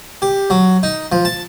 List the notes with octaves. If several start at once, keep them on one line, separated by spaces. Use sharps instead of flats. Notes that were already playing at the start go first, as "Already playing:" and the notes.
G4
F#3
D#4
F3
A5